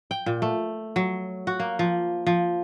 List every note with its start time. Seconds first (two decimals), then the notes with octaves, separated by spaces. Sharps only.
0.11 G5
0.26 A#2
0.42 A3
0.96 F#3
1.47 F#4
1.60 A#3
1.79 F3
2.27 F3